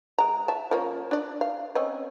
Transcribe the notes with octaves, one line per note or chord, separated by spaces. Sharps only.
G#3 A#5
E5 A5
F3 A#3 C#4
D4 D5
F5
C4 C#4 D#5